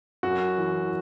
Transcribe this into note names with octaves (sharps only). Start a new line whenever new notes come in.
F#2 F#4
E3